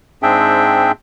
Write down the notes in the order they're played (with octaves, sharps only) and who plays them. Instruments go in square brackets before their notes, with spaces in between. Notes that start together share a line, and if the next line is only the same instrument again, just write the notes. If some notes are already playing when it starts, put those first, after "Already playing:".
[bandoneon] G#2 C4 D4 G#4 E5 G5